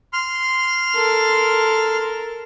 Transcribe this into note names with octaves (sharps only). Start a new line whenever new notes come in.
C6 F6
A4 A#4